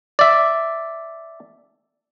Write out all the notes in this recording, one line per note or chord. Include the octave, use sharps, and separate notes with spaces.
D5 E5